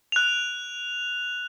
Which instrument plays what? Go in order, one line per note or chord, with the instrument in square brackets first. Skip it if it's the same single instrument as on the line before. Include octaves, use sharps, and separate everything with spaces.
[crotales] F#6 F7